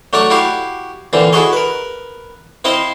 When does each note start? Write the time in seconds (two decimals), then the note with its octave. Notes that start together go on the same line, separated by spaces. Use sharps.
0.13 F#3 A3 D4 D5 A#5 C#6
0.30 E4 F#4 G4 F5 C#6
1.13 A#2 D3 E3 C4 F4
1.33 E4 F#4 G#4 A4 C#5 D#5
1.53 A#4 B4
2.64 C4 E4 C5 D#5 F5